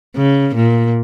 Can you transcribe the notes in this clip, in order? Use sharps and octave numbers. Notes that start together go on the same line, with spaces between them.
C#3
A#2